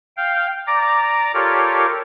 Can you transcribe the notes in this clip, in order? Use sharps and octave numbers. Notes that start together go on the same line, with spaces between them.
F5 G5
D5 A#5 D6
F4 G4 A4 A#4 C#5 D5